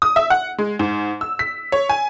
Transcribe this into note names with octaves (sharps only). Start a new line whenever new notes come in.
D#6
E5
F#5
G#3
G#2
E6
B6
C#5
G#5